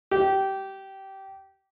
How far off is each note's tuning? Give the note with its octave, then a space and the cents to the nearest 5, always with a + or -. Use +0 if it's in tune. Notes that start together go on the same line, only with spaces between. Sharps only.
G4 -20